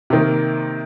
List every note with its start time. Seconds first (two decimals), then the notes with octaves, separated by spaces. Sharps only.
0.10 C3 D#3 A#3